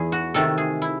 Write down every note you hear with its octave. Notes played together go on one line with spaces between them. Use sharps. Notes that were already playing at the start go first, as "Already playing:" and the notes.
Already playing: E2 G#4
F#4
C3 D#3 A3 A4
G#4
E4